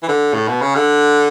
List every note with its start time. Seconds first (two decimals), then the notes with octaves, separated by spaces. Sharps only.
0.03 E3
0.08 D3
0.34 A2
0.48 B2
0.62 C#3
0.76 D3